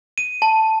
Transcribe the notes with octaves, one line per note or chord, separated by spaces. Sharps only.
D#7
A5